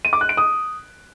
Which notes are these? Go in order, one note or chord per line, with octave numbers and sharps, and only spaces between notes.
D#7
D6
F#6
D7
D#6